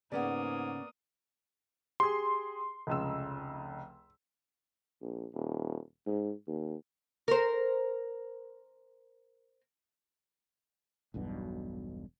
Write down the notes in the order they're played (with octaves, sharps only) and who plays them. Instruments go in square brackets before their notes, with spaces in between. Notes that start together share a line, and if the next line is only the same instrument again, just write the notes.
[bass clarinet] G#2 [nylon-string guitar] C#3 C#4 F#5 [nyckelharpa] A#3 D#6 [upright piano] B3 D5
[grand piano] G4 G#4 [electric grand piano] C6
[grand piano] F1 C#2 E6
[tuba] A#1
D#1
G#2
D#2
[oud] A#4 C5
[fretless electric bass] E1 B1 G2 B2